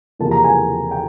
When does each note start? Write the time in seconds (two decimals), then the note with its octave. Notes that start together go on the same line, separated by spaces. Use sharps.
0.19 E2 C3 F3 A#3 A5
0.31 A#5
0.44 G#5
0.91 G5